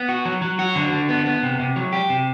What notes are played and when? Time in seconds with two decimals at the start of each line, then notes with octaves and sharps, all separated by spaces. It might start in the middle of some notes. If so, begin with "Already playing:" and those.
Already playing: B3
0.09 F#4
0.25 F#3
0.42 F#3
0.59 F#4
0.76 D3
0.92 D3
1.09 B3
1.26 B3
1.43 C3
1.59 C3
1.76 F#3
1.93 G4
2.10 C3